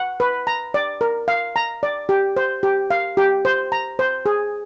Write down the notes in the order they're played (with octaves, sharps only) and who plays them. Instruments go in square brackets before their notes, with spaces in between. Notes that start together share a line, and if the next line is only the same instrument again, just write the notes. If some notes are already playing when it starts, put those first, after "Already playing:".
Already playing: [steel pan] F#5
B4
A#5
D5
A#4
F5
A#5
D5
G4
C5
G4
F5
G4
C5
A#5
C5
G#4